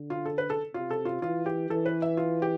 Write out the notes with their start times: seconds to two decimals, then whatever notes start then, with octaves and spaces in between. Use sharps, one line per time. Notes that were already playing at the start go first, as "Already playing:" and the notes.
Already playing: D3
0.10 F4
0.26 A4
0.38 B4
0.50 A4
0.74 C3 F4
0.91 A4
1.05 F4
1.22 E3 F4
1.46 G4
1.70 E3 A4
1.86 B4
2.02 E5
2.17 F4
2.42 G4